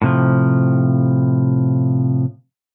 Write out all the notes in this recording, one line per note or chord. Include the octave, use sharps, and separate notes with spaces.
A2 C3 F3